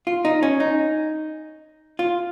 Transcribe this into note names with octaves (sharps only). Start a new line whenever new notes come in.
F4
D#4
C#4
D#4
F4